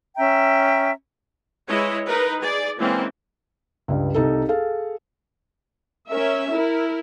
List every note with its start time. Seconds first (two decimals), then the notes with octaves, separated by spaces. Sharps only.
0.17 C#4 E5 G5 A#5
1.67 G#3 E4 B4 C#5 D#5
2.06 D#4 A#4 B4
2.42 G#4 D5
2.79 E3 G#3 A#3 C4 C#4
3.88 C#2 G2
4.14 C2 D#4 A4
4.48 G#4 A4 F5
6.10 C#4 A#4 E5
6.53 E4 A#4